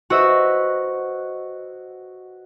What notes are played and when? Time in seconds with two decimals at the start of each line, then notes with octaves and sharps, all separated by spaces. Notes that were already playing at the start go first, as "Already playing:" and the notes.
0.10 F#4 B4 C5 D#5 E6